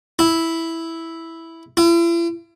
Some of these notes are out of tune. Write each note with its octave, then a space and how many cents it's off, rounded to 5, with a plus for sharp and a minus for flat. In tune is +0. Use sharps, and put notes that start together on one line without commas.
E4 -5
E4 +40